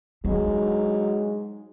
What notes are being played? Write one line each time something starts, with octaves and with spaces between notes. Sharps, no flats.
F#3 G#3 D#4